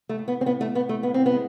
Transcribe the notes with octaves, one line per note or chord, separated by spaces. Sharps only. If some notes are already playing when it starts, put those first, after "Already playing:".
A3
A2
B3
C4
A2 B3
A3
A2 B3
A3
A2 B3
C4
B3
G#3